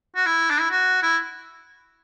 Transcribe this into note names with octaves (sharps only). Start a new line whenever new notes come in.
F#4
E4
D4
E4
F#4
E4